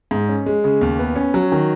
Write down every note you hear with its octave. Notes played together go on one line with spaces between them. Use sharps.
G#2
C#4
G#3
C#3
D#2
B3
C#4
F#3
D#3